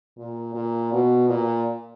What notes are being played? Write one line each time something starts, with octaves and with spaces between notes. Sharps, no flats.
A#2
A#2
B2
A#2